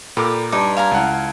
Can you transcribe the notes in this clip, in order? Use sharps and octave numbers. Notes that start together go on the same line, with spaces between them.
A#2 G4 A4 A#4 A#5 B5 D6
G2 D#4 A5 D6
F5 G#5 A#5
C#2 E4 F#5 A5 G#6